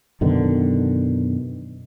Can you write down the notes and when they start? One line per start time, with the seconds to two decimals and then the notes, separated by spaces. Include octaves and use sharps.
0.21 F#2 B2 D3 D#3